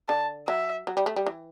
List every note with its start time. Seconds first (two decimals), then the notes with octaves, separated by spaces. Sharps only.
0.08 D3 A5
0.47 F#3 E5
0.87 F#3
0.97 G3
1.06 A3
1.16 G3
1.26 E3